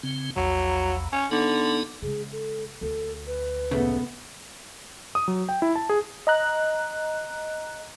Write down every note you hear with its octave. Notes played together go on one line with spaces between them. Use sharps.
C#3 C4
A#1 E2 F#3
C#4
D3 B3 D#4
C#3 G#3 G#4
A4
D2 A4
B4
A#1 C#3 A3 B3
D#6
F#3
G5
E4
A5
G#4
D#5 A#5 F#6